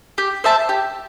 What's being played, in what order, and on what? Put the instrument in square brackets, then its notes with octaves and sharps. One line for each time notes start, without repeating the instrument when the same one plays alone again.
[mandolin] G4
C5 E5 A5
G4